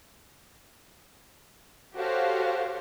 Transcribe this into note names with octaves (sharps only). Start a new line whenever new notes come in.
F#4 G4 A4 C5 C#5 F5